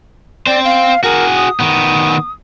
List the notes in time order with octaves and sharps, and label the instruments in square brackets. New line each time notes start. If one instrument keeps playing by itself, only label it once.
[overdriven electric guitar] C4 C5 [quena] D5
[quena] F5
[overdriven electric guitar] F#4 G#4 [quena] A#4
[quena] D#6
[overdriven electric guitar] D#3 B3